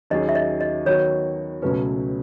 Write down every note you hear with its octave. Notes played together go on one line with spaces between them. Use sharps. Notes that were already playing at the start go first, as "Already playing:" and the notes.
D#2 D#3 F#3 C#4 G#4 D#5
E5
D#5
D#5
D#3 F#3 B3 F#4 C#5
C#2 B2 F#3 A3 C#4 B4